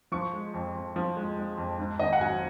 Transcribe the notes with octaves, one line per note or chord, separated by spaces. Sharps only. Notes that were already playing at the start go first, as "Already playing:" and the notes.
F3 C#6
G#3
F2
F2
F3
G#3
G#3
F2
G#2
G#1 D#5
F#5
F#3 G#5